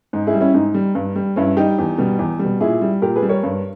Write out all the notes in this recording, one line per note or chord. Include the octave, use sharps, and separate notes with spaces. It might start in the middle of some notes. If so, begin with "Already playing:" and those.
G#2 D#4
E4 G#4
G3
C#4 E4
G#2 D#4
G3
G2
G3
G2 C#4 E4
G3 D#4 G4
E2
B2 G3
E2
G3
B2
A#2 E4 G#4
G3
A#2 G4 A#4
G#4 B4
G3
A#4 C#5
G2